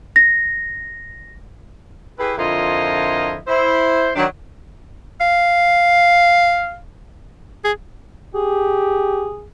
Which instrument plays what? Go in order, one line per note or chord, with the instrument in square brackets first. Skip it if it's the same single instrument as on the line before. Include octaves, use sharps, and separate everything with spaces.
[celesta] A#6
[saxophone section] E4 G4 G#4 B4
F2 D3 E4 F4 A#4 D#5
E4 C5
D#3 F#3 D4
[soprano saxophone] F5
G#4
[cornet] G4 [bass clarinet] G#4